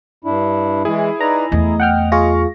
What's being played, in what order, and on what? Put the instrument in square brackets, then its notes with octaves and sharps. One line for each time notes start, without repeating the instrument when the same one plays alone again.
[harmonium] G2 D4 E4
[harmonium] E3 G#3 [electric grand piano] E4 G#4
[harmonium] D#4 B4 D5 [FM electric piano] A#5
[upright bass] E2 A3 [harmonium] D#5
[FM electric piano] F#5 G5 F6
[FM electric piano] F4 G#4 [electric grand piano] F5 C#6 A#6